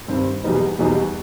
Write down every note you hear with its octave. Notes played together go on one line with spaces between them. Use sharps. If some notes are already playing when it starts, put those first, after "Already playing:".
G2 D#3 G3 C4
E2 B2 G3 B3 D#4
E2 B2 G3 B3 D#4